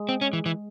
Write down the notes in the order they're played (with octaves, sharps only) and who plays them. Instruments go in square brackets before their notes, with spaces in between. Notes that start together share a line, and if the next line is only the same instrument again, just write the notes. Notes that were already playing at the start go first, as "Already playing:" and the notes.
Already playing: [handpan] G#3
[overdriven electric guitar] C4
C#4
E3
E3